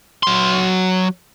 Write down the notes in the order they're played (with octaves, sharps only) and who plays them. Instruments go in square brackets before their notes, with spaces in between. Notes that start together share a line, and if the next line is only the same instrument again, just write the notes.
[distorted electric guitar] F#3 C6